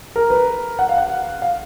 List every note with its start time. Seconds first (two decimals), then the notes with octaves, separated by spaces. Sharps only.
0.16 A#4
0.30 B4
0.79 F#5
0.89 F5
0.98 F#5
1.42 F5